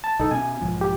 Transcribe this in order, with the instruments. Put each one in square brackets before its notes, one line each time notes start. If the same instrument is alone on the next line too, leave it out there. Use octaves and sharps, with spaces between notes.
[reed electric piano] A5
[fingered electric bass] B1 [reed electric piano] D#4 A4
[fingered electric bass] B2 C#4 [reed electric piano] G#5
[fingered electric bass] B1 G#2 F3
[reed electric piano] G4